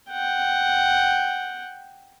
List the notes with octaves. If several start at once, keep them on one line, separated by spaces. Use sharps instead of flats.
F#5 G5